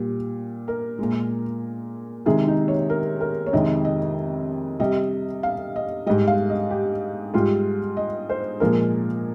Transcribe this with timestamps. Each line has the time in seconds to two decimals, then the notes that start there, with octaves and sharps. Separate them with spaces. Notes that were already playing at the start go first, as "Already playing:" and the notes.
Already playing: A#2 G3
0.68 A#4
0.99 A#2 G#3
2.26 C3 D#3 G#3 G#4
2.47 D#4
2.68 C#5
2.90 A#4
3.21 A#4
3.46 C#5
3.53 F2 C3 D#3 G#3 D#5
3.85 D#5
4.79 C3 G3 D#5
5.43 F5
5.76 D#5
6.06 G3 D#5
6.10 G#2
6.27 F5
6.49 D#5
6.70 G4
7.34 G#2 G3 F4
7.97 D#5
8.29 C5
8.60 A#2 F3 G#3 A#4